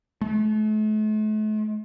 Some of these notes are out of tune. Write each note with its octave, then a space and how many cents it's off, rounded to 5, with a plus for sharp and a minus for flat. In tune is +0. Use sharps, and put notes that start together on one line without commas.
A3 -40